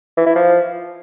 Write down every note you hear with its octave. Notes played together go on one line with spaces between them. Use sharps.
E3
E4
F3